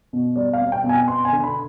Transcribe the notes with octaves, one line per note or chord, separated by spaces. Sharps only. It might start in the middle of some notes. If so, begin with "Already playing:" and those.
B2
G3 D5
F5
C4
G5
B2
G#5
B3 C6
G#5
D3
B5